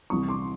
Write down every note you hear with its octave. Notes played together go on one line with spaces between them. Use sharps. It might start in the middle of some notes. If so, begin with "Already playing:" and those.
C2 C3 E3 C#6 D#6
C6 D6